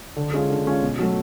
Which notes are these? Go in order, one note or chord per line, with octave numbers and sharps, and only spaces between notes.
D3
G#3 C#4 F4
D3
G#3 C#4 F4
B2
F#3 A3